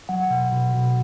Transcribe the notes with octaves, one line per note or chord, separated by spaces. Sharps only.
F#3 F#5
B2
B2
B2